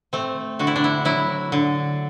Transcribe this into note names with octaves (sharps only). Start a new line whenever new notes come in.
A3 C4
D3 F#4
E4
D4
E4
F#3 E4
D3